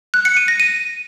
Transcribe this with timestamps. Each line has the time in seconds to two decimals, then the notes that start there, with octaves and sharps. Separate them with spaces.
0.14 F#6
0.25 C#7
0.37 D#7
0.48 A#6
0.60 D#7